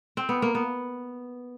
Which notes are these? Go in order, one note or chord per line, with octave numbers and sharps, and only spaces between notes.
C4
B3
A#3
B3